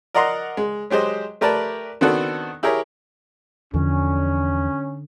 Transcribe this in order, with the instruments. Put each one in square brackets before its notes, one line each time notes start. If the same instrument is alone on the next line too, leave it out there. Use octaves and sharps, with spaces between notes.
[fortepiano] A#4 D5 D#5 F#5 A#5 C6
G#3
F#3 G#3 G4 C5 D#5
A3 G4 A#4 B4 D5 A5
D#3 B3 C4 D4 F#4 A4
E4 G4 G#4 A#4 C#5
[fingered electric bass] E2 E3 F3 [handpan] D3 [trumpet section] C#4